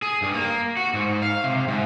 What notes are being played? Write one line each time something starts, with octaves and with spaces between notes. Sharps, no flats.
G#4
G2
A#3
F#4
G#2
F5
C3
G#2